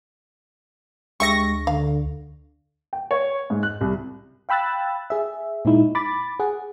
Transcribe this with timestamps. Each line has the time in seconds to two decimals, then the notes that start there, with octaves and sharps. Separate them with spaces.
1.20 D2 G#3 G4 E5 C#6 A#6
1.67 D3 F5
2.93 G5
3.11 C#5
3.50 G#2
3.63 F#6
3.81 C2
4.49 F5 G5 B5 E6 F#6 A6
5.10 G#4 E5
5.65 A#2 G#3 D#4 E4
5.95 B5 D6 A6
6.40 G#4 F#5